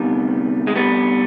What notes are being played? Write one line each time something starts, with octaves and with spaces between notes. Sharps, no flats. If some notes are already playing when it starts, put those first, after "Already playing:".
Already playing: D2 C3 D#3 G3 B3
G#3
G3 B3